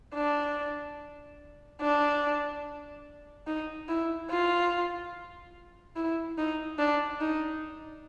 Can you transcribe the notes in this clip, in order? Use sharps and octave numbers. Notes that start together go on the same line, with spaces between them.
D4
D4
D#4
E4
F4
E4
D#4
D4
D#4